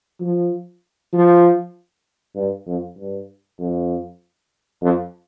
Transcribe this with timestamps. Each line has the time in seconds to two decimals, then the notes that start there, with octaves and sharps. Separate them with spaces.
0.21 F3
1.13 F3
2.36 G2
2.67 F2
2.98 G2
3.59 F2
4.82 F2